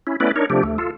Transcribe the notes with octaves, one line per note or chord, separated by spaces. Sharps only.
C#4 E4
A3 B3 C#4 E4 B4 D5
D4 D#4 A#4 C#5
C3 F3 A3 D4 G4
D2 A3
F4 A4